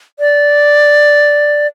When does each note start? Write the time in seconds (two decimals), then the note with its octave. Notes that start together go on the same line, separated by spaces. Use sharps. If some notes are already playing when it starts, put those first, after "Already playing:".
0.19 D5